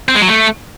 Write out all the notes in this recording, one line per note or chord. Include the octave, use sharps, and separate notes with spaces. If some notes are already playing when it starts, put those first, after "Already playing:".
C4
G#3
F#3
A3